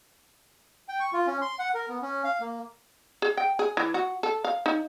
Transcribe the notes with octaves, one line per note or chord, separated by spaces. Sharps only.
G5
C#6
F4
C#4
C6
F#5
A#4
B3
C#4
F5
A#3
G#4
G5
G#4
E3
F#4
A4
F5
D#4